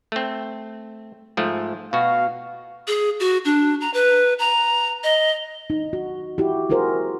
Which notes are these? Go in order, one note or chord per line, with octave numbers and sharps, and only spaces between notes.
A3 C4
G#2 F3 A3
B2 F#4 F5
G#4
F#4
D4
A#5
B4
A#5
D#5
D#4
F#4
E4 F#4 G4
E4 F#4 G#4 A#4 C5